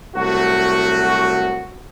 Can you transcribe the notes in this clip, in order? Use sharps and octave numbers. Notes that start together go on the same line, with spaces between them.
C2 F#3 A3 F#4